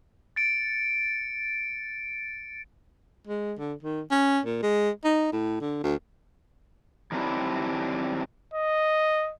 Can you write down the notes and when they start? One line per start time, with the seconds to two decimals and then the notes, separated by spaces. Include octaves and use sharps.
0.36 A6 C#7 D7
3.28 G#3
3.59 D3
3.83 D#3
4.11 C#4
4.46 A#2
4.63 G#3
5.04 D#4
5.33 A2
5.61 D3
5.84 D2
7.12 D#3 F#3 G3 C4 D4 E4
8.54 D#5